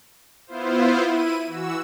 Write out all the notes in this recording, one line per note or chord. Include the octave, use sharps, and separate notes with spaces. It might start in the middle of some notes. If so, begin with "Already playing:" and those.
B3 E4 F4 C5
E4 D#7
E3 F#4 E6